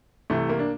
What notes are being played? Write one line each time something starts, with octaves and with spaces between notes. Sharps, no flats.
C2 C3 E3 A3
A#3
D4